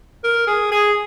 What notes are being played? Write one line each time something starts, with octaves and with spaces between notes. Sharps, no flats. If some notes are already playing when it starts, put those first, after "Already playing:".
A#4
G#4
G#4